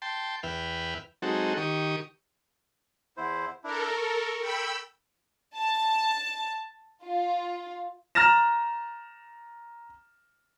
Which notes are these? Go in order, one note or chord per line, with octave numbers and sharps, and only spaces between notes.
G5 A5 C6
E2 B4 E5 G5 F6
F#3 G#3 C4 D#4 F#4 A4
D#3 G4 C#6 D#6
E2 E4 C5
D4 E4 A4 A#4
C#6
G5 B5 E6
A5
F4
A#5 F6 A6 A#6 E7